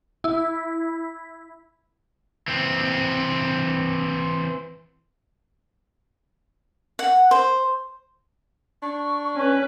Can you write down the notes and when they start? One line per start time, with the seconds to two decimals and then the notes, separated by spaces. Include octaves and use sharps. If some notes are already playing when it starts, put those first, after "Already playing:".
0.24 E4
2.48 E3 C4
6.99 F#5
7.31 C5
8.82 D4 C#6
9.36 C#4 B4